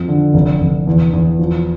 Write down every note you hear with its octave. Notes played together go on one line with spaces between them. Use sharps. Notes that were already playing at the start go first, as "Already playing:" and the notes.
Already playing: F2
D3
F1
F1
E2
E2
F3